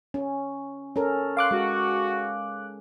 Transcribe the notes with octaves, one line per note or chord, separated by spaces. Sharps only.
C#4
C#4 A4 A#4
F5 C6 D6 F#6
G#3 F#4